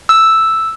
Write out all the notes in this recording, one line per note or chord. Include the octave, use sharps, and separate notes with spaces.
E6